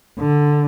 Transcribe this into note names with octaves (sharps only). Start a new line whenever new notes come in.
D3